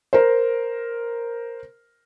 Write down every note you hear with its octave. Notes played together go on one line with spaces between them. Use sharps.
A#4 C5